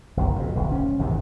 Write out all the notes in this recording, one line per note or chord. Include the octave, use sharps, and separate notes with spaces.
F#1 B1
F2 B2
D1 B1
C#4
G#1 E2 C3 D#3